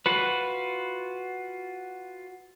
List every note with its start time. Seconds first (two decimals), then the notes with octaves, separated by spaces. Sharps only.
0.06 F4 F#4 B4